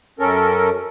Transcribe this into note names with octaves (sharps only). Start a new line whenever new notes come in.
F#2 C#4 A4 A#4